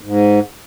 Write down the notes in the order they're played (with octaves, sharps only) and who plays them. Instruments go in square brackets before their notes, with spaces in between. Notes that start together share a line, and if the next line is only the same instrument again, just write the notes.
[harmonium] G#2